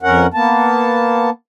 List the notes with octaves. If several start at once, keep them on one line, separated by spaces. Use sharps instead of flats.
F2 C#4 A#4 F#5
A#3 B3 A5